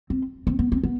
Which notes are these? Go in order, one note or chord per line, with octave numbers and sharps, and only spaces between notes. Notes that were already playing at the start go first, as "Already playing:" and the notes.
C4
C4
B3
C4
B3